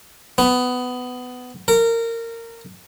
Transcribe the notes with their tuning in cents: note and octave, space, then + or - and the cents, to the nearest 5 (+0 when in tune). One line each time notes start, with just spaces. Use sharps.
B3 +15
A#4 -20